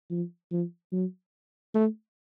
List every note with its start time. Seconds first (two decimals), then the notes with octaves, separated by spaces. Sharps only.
0.10 F3
0.51 F3
0.92 F#3
1.74 A3